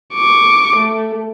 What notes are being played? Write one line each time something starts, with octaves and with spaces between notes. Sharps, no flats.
C#6 D6
A3